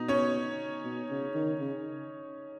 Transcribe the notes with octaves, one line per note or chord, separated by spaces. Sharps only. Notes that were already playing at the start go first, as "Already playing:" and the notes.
Already playing: B2 D#4
C#4 C#5
B2
C#3
D#3
C#3